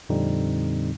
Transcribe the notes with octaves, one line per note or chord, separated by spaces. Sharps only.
F2 A#2 D3 G3 C4 D#4